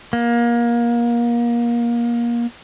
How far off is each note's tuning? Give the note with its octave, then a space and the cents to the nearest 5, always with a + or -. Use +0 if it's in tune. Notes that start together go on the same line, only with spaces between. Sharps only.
A#3 +25